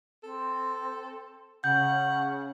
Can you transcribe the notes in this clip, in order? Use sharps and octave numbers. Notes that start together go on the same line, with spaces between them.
C4 A4
C#3 C#4 F#5 G6